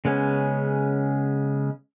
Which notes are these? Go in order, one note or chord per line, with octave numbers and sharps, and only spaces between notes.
C#3 G#3 B3 C#4